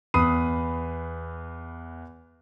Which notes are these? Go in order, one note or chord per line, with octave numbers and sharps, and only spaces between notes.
E2 B4 B5 D#6 C7 D#7